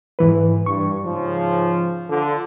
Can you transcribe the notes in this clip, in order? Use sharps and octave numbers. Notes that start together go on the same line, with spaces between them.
G#2 E3 B4
G2 C#6
G#2 C#3 F3
D3 F3